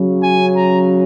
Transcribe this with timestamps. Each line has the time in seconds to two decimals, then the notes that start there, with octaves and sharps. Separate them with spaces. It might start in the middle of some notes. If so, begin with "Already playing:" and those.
Already playing: C#3 F#3 C#4
0.23 G#5
0.55 A#5